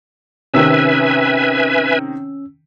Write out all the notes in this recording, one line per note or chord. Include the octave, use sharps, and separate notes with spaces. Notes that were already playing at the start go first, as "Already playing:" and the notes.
C3 D#3 C4 C#4 B4 E5 G#5 E6